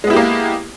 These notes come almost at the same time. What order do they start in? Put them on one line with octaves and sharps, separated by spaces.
G#3 B3 E4 G4 A#3